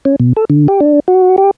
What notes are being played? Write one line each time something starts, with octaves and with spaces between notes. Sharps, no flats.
C#4
B2
A4
D3
G4
D4
F#4
G4